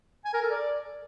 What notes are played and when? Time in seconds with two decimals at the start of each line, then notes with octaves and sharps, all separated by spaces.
0.25 G#5
0.33 A#4
0.42 A4
0.50 D5